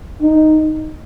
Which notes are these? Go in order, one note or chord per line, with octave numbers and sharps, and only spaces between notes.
D#4